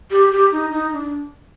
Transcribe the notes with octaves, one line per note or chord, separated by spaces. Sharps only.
G4
G4
D#4
D#4
D4